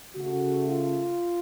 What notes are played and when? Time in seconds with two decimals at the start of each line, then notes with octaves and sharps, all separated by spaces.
0.16 C#3 A3 F#4
0.68 F4